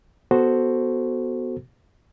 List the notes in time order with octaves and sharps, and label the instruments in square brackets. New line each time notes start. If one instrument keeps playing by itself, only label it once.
[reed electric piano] B3 F#4 A4 C5